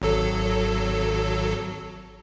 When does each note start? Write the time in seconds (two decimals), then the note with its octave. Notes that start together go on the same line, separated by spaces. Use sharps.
0.02 G#1 F#3 A4